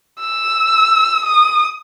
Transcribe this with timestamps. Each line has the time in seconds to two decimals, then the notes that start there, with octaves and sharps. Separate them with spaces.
0.20 E6
1.25 D#6